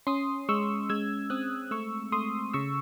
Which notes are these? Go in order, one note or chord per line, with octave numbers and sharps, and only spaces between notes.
C#4 C6 D#6
G#3 C#6 E6
G#3 E6 G#6
C4 D#6 F#6
A3 C#6 E6
A3 C6 D#6
C#3 C#6 E6